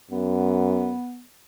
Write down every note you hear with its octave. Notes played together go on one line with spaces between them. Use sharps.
F#2 B3